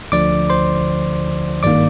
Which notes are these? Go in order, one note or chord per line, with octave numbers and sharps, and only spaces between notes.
D2 D3 F3 D5 D6
C5 C6
G#1 G2 D#3 A#3 D5 D6